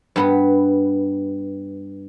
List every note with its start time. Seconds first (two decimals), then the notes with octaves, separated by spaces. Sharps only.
0.16 G2 B3 B4